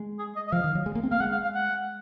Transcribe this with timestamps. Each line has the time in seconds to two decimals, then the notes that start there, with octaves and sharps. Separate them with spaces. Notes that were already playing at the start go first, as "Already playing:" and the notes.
Already playing: G#3
0.19 G#4
0.36 D#5
0.48 D#5
0.52 F3 F5
0.64 D#3
0.75 F#3
0.86 G#3
0.95 A#3
1.03 C4
1.11 A#3 F5
1.20 G#3 F#5
1.32 F5
1.43 F5
1.55 F#5